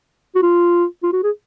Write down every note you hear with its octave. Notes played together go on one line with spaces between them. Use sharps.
F#4
F4
F4
F#4
G#4